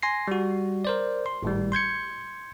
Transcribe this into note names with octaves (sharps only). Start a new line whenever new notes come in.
G#5 C6 A#6 C7
G3 F#4
A#4 C5 D5
C6
G#1 A2 G3
C6 G6 G#6 C#7